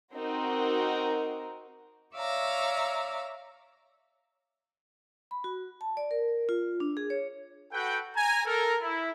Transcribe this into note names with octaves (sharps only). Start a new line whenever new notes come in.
C4 D#4 F#4 A#4
C#5 D5 E5 F5 A#5
B5
F#4
A5
D5
A#4
F4
D4
G#4
C#5
F#4 A4 B4 F#5 G5
G#5 A#5
A4 A#4
E4